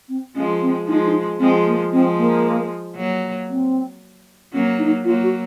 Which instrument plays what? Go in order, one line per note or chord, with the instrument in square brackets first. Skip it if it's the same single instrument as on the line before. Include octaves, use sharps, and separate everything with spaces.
[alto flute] C4
[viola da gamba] F3 G#3 [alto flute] C#4
[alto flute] C4
[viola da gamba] F3 G#3 [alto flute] D#4
[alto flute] D#4
[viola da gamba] F3 G#3 [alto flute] C4
[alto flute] A#3
[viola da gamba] F3 G#3 [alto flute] C4
[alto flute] A#3
[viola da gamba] F#3 A#3
[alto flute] C4
[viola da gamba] F#3 A#3 [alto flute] C#4
[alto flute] D#4
[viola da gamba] F#3 A#3 [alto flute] F4
[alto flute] F#4